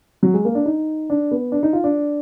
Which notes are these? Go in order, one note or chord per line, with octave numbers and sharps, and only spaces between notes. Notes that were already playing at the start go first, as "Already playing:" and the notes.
F#3
G#3
A#3
D4
D#4
D4
B3
D4
D#4
F4
D4